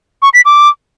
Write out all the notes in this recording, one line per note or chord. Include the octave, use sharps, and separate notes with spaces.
C#6
B6
D6